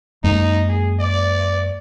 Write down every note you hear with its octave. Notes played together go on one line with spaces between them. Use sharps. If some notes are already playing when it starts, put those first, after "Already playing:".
F#2 G#3 A#3 D#4
G#4
D5